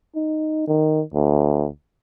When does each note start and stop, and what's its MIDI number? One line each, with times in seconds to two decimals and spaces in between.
0.16 0.64 63
0.67 1.02 51
1.14 1.68 38